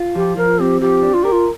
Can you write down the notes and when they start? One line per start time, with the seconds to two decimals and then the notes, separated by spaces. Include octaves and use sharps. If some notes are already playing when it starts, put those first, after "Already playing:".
Already playing: F4
0.15 F3 G4
0.37 F3 A#4
0.60 C4 G4
0.81 F3 G4
1.03 D4
1.14 F4
1.23 G4 A#4
1.32 F4